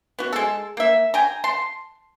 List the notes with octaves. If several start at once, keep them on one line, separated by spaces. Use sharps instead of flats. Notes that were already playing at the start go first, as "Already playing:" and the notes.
B3 F#4
G#3 A4
A#3 E5
G5 G#5 A#5
A5 C6